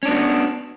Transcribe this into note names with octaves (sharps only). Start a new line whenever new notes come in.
B3 C#4 D4 F#4